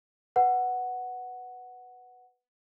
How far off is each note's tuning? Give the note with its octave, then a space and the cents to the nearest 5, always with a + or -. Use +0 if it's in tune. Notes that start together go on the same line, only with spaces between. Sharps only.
B4 +0 F#5 +0